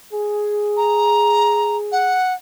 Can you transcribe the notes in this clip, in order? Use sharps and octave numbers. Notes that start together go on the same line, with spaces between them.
G#4
A#5
F#5